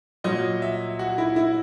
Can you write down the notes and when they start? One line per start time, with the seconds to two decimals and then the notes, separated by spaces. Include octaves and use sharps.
0.24 A#2 F#3 D#5
0.62 E5
0.99 F#4
1.18 E4
1.36 E4